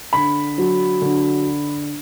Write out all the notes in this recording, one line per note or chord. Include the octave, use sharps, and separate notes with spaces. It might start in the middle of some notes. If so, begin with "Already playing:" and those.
D3 B5
F#3
D3